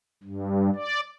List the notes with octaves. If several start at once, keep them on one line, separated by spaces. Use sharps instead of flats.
G2
D5